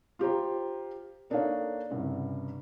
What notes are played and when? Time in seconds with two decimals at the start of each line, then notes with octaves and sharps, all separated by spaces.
0.19 F4 G4 C5 A#5
1.30 A#3 D4 D#4 A4 C#5 F5
1.91 C2 G2 C#3